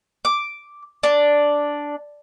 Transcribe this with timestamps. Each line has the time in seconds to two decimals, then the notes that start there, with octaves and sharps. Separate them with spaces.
0.25 D6
1.03 D4